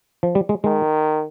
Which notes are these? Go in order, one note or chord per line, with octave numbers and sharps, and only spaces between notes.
F3
G3
G#3
D#3 G#3